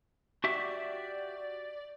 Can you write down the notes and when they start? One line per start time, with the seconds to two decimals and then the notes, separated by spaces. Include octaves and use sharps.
0.44 F#4 G4 D5 E5